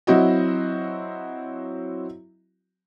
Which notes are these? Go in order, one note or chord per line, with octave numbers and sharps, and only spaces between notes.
F#3 C4 E4 F#4 D#5